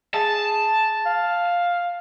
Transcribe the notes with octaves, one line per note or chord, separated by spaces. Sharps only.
G#4 A5
F5